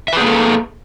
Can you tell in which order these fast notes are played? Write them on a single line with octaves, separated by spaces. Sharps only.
E5 B4 G#4 A#3 A4